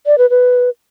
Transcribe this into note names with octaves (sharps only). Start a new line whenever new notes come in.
D5
B4
B4